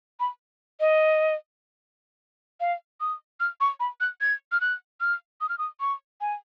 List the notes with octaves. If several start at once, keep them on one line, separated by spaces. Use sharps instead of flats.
B5
D#5
F5
D#6
F6
C#6
B5
F#6
G#6
F6
F#6
F6
D#6
F6
D#6
C#6
G#5